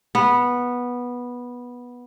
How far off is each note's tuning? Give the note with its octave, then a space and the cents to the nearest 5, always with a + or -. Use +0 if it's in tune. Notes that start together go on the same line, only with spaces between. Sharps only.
B3 -10